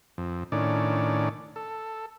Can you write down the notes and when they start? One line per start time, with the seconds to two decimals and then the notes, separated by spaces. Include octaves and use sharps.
0.18 F2
0.52 A2 D#3 C#4 D4 D5
1.56 A4